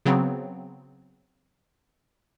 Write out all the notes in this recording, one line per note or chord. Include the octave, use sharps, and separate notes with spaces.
C#3 F#3 B3 C4